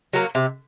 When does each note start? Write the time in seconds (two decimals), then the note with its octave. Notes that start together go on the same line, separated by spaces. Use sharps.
0.13 F#3 A#3
0.35 C3